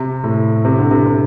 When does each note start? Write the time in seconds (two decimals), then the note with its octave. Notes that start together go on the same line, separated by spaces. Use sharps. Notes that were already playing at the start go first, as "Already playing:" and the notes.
Already playing: C3
0.24 A2
0.65 C3
0.78 D3
0.91 C3
1.06 C3